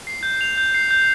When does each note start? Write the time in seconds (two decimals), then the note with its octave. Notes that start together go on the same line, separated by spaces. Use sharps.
0.07 C7
0.23 G6
0.41 F7
0.58 G6
0.74 C7
0.91 G6